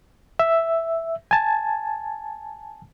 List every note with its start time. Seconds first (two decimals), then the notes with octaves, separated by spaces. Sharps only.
0.39 E5
1.31 G#5 A5